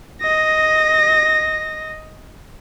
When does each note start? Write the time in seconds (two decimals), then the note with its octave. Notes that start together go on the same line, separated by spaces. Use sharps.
0.21 D#5 A#6